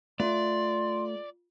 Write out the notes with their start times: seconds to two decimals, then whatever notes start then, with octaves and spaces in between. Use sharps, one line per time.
0.20 A3 F4 D5 C6